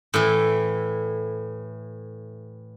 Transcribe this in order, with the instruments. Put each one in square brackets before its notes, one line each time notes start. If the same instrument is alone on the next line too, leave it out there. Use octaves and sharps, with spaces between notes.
[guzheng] A2 E3